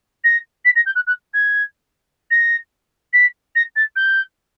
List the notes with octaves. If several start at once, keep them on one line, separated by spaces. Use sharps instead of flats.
A#6
B6
A#6
G6
F#6
F#6
G#6
A#6
B6
A#6
A6
G6